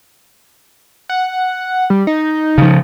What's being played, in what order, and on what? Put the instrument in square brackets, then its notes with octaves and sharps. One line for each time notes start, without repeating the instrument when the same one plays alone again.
[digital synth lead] F#5
G3
D#4
[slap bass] C#3 F3